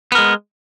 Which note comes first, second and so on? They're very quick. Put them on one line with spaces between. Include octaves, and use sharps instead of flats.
B3 A#4 G#3